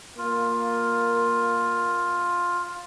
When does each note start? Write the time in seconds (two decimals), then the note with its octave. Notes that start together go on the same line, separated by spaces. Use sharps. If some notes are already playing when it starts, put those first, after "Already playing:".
0.18 A#3 F4